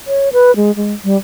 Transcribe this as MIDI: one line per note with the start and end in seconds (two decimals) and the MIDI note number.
0.07 0.29 73
0.33 0.54 71
0.56 0.75 56
0.76 0.93 56
1.04 1.16 55